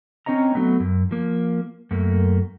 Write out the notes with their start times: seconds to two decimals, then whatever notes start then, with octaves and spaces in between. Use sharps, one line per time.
0.26 C4 C#4 C#5 D#5 A#5
0.55 F#3 A3 B3
0.80 F#2
1.11 F3 A#3
1.91 F#2 A3 A#3